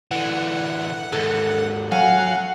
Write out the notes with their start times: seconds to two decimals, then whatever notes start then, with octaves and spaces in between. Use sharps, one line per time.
0.11 D3 E3 F#5
1.12 D#2 G#2 A4
1.92 F#3 F5 F#5 G#5